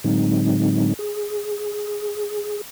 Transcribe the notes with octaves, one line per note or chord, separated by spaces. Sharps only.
A2 D3 F#3 G#3 C4 D#4
G#4